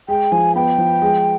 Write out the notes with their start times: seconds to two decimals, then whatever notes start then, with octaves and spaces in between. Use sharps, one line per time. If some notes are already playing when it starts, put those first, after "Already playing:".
0.08 G#3 G5
0.32 F3 G#5
0.55 B3 G5
0.78 F3
1.02 G#3